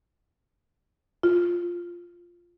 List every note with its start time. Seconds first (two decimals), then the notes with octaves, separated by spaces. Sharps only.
1.23 F4